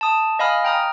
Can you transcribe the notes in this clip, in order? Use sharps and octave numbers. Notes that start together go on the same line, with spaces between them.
A5 D#6
D#5 F5 G#5 B5 D#6 F6
G5 A#5 D#6 F6